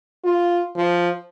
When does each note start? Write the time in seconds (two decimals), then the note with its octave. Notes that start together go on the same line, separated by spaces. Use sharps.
0.24 F4
0.77 F3